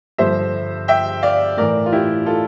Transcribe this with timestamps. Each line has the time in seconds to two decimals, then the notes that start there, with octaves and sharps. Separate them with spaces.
0.18 G2 D3 F3 C5 E5
0.88 E5 G5
1.22 D5 F5
1.57 A2 E3 A#4 D5
1.86 F4
1.92 E4 G4
2.26 F4 A4